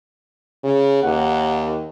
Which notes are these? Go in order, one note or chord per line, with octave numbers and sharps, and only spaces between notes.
C#3
D#2 F#5